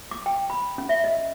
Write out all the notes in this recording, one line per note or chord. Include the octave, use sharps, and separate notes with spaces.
D6
G5
B5
C#4
E5
D#5